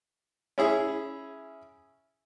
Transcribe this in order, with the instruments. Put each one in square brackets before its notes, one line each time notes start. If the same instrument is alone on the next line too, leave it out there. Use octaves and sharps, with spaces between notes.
[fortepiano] C#4 E4 G#4